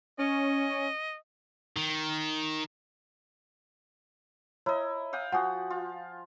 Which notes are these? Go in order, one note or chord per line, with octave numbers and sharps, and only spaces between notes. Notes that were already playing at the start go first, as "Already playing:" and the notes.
C#4 D#5
D#3
E4 C#5 D#5 A#5
F5 G5 D#6
F3 F#4 F#5 G#5 D#6
F4